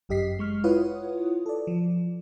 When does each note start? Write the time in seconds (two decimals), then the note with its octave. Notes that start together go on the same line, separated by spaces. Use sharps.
0.09 G1 F#2 G4 D#5 B6 C7
0.39 G#3 C#6 F6
0.64 E4 F4 B4 C#5 F#5 D#6
1.46 A4 D5
1.67 F3